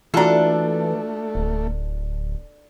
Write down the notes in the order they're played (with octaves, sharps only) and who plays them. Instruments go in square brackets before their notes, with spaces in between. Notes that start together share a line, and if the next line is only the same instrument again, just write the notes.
[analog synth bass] E3 [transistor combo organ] A3 [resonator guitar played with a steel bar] D4 A4 [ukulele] F4 F#4 A#5
[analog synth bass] D1